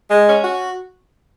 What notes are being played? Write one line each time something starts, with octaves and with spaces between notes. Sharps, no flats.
G#3
C#4
F#4